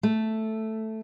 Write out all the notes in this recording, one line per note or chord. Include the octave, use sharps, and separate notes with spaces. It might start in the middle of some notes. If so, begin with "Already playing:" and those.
A3